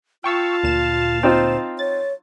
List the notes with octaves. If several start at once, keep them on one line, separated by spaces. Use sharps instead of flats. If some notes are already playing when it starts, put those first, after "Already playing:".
F4 F5 G5 A5 C#6 E6
D2 A#2 E7
C4 D#4 F4 C5
C#5 A6